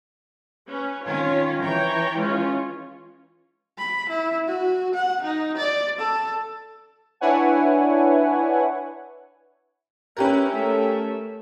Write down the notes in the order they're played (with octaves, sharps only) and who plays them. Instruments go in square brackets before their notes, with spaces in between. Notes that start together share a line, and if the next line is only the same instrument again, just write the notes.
[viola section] C#4 B4
[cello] D#3 C#4 [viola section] F4 C#5 F5
[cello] E3 [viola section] C#5 G5 A#5
[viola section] G#3 C#4 F4
[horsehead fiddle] B5
E4
F#4
F#5
D#4
D5
A4
[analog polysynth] D4 E4 B4 C#5 F#5 G#5
[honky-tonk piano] C#4 G4 A#4 [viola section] E4 B4
[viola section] A3 A4 E5